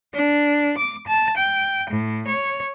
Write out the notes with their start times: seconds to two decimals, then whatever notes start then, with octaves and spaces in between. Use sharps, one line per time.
0.14 D4
0.77 D6
1.07 A5
1.36 G5
1.89 A2
2.28 C#5